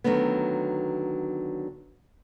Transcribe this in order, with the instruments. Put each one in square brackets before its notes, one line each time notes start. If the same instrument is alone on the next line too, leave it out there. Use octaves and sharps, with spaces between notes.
[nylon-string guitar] D3 D#3 F#3 A3 B3